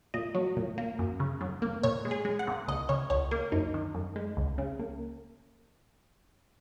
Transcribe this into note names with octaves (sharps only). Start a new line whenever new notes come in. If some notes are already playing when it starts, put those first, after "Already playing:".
A#2 D#5
F#3
A#2
A#3
F#2
C#3
F#2
A#3
A#2 C#5
G#3
G#4
G#3
F#5
A#2
C#2 D#5
C#3 C#5
C#2 C#5
A#3 A#4
F#2 D#4
D#3
F#2
G#3
C#2
C#3
A#3